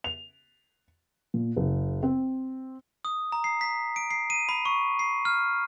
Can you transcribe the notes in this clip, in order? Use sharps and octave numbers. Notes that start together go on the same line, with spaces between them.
F7
A#2
F#1
C4
D#6
A#5
C7
B6
D7
C7
D#7
B5
C#6
C7
F6